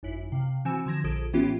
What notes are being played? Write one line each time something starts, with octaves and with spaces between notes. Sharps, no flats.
G#1 F#2 E4
C3 F5
E3 C4 F#4 G#5 E6 E7
D3 F3 G#6 A#6 E7
A#1 A4 D#6 G#6 D7
A2 E3 B3 C#4 F4 G4